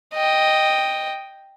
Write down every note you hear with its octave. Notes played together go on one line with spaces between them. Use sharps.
D#5 G5